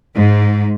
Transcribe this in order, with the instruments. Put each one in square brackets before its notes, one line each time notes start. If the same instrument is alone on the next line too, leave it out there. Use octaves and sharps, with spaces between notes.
[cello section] G#2